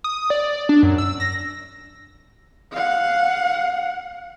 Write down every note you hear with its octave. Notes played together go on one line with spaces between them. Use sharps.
D#6
D5
D4
F#2
E6
A#6
F5 F#5